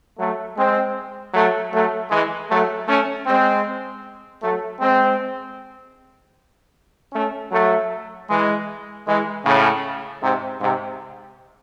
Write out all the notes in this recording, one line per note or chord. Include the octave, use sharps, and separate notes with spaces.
F#3 A3
G#3 C4
F#3 A3
F#3 A3
E3 G#3
F#3 A3
A3 C#4
G#3 C4
F#3 A3
G#3 C4
A3 C#4
F#3 A3
E3 G#3
E3 G#3
A2 C#3
G#2 C3
G#2 C3